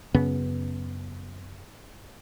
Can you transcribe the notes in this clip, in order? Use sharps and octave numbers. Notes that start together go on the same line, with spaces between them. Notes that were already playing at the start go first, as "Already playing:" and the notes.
F#2 C#3 B3